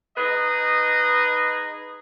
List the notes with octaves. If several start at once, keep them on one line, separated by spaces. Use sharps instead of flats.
D#4 G#4 B4 D#5